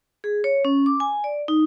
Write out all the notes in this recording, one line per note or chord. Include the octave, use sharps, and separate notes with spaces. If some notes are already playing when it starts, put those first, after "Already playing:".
G#4
C#5
C#4
D6
G#5
D5
D#4